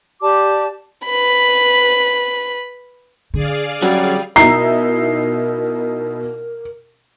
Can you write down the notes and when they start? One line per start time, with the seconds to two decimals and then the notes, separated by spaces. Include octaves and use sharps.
0.21 G4 D5 A5 D6
1.06 B4 B5
3.34 D3 G#4 D5 F5
3.82 F#3 G3 C#4 F#4
4.36 B2 D#4 E4 A#4 A#5 C7